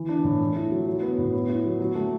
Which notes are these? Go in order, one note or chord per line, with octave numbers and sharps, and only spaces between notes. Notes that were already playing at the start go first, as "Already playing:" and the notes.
Already playing: E3
D4
A2
A3
E4
F#3
F#3
B3
A2
B3
E4
F#3
F#3
A3